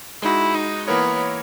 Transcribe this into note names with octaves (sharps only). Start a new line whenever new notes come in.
G#3 D#4 E4 F#4
D#4
E3 A#3 B3 E4 A#4 C#5